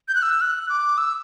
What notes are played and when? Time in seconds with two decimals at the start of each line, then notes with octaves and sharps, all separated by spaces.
0.08 G6
0.15 F#6
0.22 E6
0.41 F#6
0.70 D6
0.98 E6